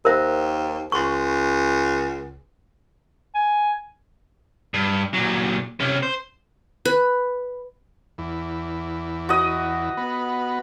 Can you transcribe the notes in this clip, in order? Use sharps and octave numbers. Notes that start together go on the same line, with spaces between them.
D#2 A#4 C5 E5
C#2 C6 C#6
G#5
G2
A#2 F#3
C3 C#4
C5
B4
E2
F#4 D#5
B3